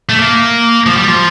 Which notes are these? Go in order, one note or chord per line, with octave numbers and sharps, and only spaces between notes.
A3
A#3
F3
G3
F3